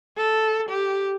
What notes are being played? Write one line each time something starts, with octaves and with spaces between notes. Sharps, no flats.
A4
G4